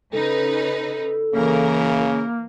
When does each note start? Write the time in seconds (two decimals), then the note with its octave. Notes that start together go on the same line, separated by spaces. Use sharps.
0.13 C#3 D#4 A4 B4
1.34 C#3 E3 A#3 A#4